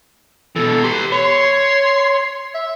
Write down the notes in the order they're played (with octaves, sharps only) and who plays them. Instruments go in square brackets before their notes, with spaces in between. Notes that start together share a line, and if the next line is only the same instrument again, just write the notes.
[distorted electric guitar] B2 E3 [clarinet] A4
[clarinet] G4 [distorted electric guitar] B4 C6
[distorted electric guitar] C#5 [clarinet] C6
[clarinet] E5